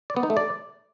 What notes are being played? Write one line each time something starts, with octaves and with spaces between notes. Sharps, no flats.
D5
B3
D#4
A3
D5